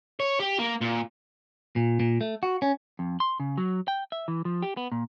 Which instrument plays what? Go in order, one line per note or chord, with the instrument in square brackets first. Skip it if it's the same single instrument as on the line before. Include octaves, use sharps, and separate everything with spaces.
[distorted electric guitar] C#5
G4
A#3
A#2
[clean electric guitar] A#2
A#2
A3
F#4
C#4
F2
C6
C#3
F#3
G5
E5
E3
F3
G4
B3
A#2